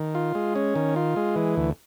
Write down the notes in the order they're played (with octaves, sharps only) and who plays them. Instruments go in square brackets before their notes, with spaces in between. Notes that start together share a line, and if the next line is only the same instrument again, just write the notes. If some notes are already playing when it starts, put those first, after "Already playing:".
Already playing: [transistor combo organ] D#3
F4
G#3
C#4
D#3
F4
G#3
E3
D2